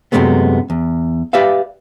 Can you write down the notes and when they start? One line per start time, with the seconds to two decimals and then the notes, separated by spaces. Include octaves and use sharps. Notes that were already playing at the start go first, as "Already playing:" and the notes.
0.12 F#2 A2 C3 G#3 A3 B3
0.70 E2
1.33 G4 B4 D5 E5 F5